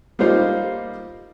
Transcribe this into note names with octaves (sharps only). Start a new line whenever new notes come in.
G3 A#3 D#4 F4 C5 F5